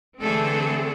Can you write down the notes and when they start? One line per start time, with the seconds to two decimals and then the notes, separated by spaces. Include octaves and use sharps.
0.21 D3 E3 A3 C4 G#4 A4